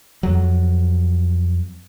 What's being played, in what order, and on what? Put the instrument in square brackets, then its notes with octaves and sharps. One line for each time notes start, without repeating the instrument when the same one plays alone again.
[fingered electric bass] F2 F#3